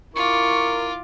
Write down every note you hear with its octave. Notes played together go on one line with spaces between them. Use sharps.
E4 F4 A#4 C#6 D6